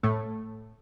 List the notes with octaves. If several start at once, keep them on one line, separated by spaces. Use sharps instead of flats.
A2 A3